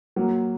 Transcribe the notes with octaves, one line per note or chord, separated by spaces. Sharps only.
F#3 A#3